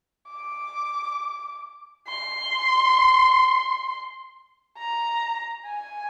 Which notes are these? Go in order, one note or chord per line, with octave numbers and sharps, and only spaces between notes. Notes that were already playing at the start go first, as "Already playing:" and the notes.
D6
C6
A#5
G#5